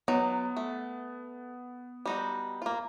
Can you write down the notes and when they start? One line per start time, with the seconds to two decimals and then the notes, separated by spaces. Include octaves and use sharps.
0.08 F#3 B3 D#4
0.57 A3
2.06 G3 D#4 F#4
2.62 A#3 F4